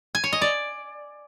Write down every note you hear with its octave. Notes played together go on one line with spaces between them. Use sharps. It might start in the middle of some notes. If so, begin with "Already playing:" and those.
G#5
C#5
D#5
D5